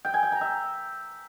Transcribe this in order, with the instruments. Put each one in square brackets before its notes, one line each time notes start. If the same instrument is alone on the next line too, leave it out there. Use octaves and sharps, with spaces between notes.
[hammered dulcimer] G5
G#5
G5
A#5
E5